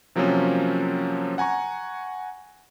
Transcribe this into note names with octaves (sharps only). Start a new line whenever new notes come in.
C3 F3 F#3 A#3 C4 C#4
F#5 G#5 A#5 C#6